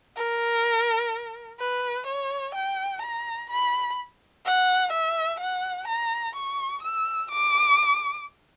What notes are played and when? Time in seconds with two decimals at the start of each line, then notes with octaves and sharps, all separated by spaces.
0.16 A#4
1.60 B4
2.07 C#5
2.55 G5
3.02 A#5
3.50 B5
4.45 F#5
4.92 E5
5.40 F#5
5.88 A#5
6.35 C#6
6.83 E6
7.31 D6